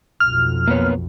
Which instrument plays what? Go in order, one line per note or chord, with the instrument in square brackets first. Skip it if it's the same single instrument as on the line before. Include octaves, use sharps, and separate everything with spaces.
[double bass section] B1 F2 [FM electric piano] F6
[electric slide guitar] A#3 B3 C#5